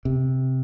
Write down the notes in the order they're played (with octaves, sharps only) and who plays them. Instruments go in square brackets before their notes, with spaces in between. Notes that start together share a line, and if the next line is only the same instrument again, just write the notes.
[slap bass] C3